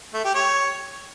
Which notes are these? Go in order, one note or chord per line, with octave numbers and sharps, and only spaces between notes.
A3
G4
C#5